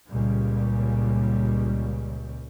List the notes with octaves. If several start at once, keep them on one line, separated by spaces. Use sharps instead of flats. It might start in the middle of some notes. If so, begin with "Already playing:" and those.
C#2 A#2 C#3 G3